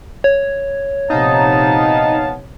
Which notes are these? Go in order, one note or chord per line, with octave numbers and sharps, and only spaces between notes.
C#5
A#1 C3 B3 D#4 F5 A5